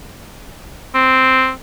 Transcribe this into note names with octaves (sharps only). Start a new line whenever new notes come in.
C4